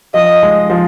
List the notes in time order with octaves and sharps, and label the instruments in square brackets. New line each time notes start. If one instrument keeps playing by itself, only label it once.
[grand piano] F3 [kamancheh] D#5
[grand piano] G#3
F3